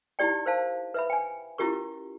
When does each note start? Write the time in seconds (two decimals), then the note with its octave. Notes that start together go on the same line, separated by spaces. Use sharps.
0.19 D#4 E4 G4 D5 G5
0.46 A#4 C5 F5 A5
0.94 B4 E5 B5
1.10 G5 G#5
1.58 C#4 E4 F4 G4 A#4 C#6